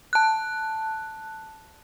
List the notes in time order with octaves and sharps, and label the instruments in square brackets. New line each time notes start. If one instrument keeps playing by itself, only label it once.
[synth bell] A5 F#6